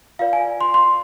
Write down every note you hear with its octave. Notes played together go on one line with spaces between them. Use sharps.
F4 B4 D5 F5
G#5
C6
C6